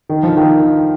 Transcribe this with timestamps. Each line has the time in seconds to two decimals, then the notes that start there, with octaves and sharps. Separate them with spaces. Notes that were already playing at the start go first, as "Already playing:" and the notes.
0.09 D#3
0.23 F3
0.37 D#3